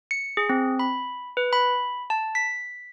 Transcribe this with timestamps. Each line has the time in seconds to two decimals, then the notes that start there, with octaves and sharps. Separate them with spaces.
0.11 C#7
0.37 G#4
0.49 C4
0.79 B5
1.37 B4
1.53 B5
2.10 A5
2.35 B6